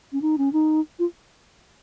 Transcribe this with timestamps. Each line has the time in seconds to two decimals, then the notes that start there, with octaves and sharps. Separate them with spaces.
0.12 C#4
0.22 D#4
0.38 C#4
0.53 D#4
0.99 F4